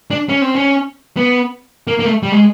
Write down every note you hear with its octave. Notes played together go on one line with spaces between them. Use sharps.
D4
C#4
C4
C#4
B3
A#3
A#3
A3
G3
G#3